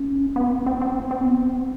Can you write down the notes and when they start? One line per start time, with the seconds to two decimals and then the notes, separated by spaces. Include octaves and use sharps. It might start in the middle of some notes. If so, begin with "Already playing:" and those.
Already playing: C#4
0.36 B3
0.51 C4
0.66 C4
0.81 C4
1.11 C4
1.26 B3
1.60 C4